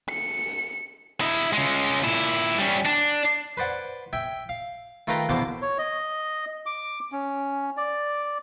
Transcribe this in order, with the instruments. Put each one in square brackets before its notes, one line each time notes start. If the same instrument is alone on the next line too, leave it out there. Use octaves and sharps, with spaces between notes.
[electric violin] C#7
[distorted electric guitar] E4 D#5
C#3 G#3
A#2 E4
G3 C#4
D4
[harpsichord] B4 C5 D5 F#5 G#5
E5 G5 G#5
F5
D#3 A3 F4 B4 G5 A#5
E2 B2 D3 C5 F5 D6
[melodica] C#5
D#5
D6
C#4
D5